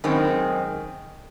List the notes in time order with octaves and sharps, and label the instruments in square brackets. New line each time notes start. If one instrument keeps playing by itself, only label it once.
[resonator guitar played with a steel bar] F#2 D#3 G#3 C4